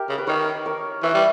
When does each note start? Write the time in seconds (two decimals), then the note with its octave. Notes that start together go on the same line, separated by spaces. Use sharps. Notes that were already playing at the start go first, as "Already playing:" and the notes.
Already playing: G4 A#4
0.09 C#3
0.18 B4
0.27 D#3 A#4 C#5
0.66 A#4 C#5
1.03 E3 C#5 E5
1.14 G3